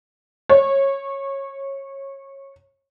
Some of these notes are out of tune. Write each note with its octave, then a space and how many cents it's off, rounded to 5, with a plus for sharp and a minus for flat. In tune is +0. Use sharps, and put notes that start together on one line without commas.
C#5 -20